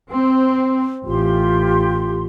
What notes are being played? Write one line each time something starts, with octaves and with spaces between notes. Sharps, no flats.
C4
A1 F4 G4 C6